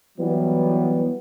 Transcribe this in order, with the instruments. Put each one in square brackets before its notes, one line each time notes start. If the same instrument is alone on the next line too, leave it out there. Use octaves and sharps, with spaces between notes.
[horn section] E3 F#3 G3 B3